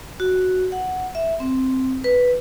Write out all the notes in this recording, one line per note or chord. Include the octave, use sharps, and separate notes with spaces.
F#4
F#5
E5
C4
B4